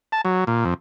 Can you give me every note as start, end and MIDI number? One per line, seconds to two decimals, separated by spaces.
0.12 0.21 81
0.25 0.44 54
0.47 0.64 46
0.65 0.74 41